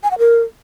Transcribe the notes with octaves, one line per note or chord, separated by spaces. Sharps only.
G#5
F#5
A#4